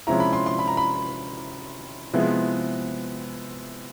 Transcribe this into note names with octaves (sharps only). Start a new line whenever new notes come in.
C3 F3 G#3 C#4 E4 A#5
B5
C6
C6
B5
A#5
B5
C3 F3 G#3 B3 E4